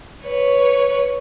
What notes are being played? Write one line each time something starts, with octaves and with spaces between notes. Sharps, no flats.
B4 C#5